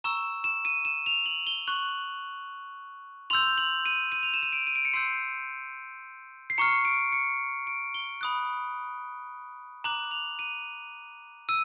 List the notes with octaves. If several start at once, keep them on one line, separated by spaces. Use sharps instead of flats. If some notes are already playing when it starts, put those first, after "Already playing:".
A#5 C#6 E6 E7
E7
D#7
E7
F7
F#7
G7
C#6 F#6 F#7
C6 E6 G6 F7
F#7
D#7
D#7
F7
E7
D#7
D7
D#7
D7
C#7
C6 E6 G6 C7
C7
A#5 C#6 F6 C#7
D7
C#7
D7
G7
B5 D#6 F#6
A#5 D6 F#6 F#7
F7
D#7
E6 D#7